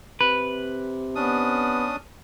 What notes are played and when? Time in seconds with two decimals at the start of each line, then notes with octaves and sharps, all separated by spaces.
0.21 C3 B4
1.15 B3 C#4 D4 D#6